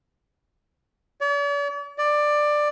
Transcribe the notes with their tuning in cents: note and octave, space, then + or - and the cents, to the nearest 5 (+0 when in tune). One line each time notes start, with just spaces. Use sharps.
D5 -45
D5 +15